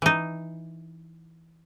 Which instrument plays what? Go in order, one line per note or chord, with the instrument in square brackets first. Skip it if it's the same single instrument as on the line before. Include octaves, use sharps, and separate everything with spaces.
[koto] E3 D#4